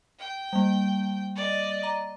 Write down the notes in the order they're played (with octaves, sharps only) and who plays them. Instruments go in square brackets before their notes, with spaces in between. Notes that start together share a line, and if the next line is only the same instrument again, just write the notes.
[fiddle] G5
[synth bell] G3 A#3
[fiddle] D5 D#5
[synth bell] A#5 D6